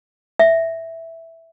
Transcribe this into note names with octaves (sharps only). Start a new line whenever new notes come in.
E5